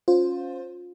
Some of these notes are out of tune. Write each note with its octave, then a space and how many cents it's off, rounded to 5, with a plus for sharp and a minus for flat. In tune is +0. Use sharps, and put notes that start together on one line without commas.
C#4 +0 F4 +25 C5 +0